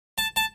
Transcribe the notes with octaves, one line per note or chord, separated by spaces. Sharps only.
A5
A5